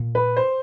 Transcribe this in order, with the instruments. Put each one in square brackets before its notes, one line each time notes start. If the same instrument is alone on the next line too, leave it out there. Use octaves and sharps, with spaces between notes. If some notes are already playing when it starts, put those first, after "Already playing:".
Already playing: [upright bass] A#2
[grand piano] B4
C5